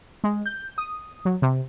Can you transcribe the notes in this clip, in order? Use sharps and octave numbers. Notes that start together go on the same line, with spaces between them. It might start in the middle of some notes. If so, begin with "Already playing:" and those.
G#3
G6
D#6
F#3
C3